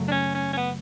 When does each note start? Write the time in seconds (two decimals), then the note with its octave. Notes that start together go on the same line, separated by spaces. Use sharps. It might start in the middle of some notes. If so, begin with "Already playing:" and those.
Already playing: F#2 C#3 F#3 A3
0.08 D4
0.12 C#4
0.35 C#4
0.53 C#4
0.57 B3